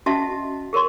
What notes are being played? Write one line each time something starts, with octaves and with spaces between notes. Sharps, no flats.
C#4 F#4 D#5 E5 F#5 A5
G#4 A#4 C#5 C6